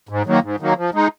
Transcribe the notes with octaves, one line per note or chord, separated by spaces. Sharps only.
G#2
D#3 F#3 A#3
G#2
D#3 F#3 A#3
F3
G#3 D#4